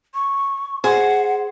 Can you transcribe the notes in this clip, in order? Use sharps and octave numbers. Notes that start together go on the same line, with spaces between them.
C#6
G#4 C5 F#5